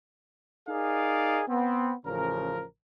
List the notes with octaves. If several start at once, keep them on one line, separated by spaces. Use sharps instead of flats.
D#4 G#4 A#4 D5 D#5 F5
B3 C4
A1 C#3 F3 A#4